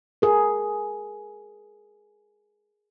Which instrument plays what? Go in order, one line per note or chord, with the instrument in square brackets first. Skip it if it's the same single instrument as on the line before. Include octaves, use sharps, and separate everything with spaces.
[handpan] G#4 A#4